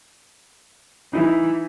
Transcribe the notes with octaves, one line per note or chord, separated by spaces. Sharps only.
E3 D#4 E4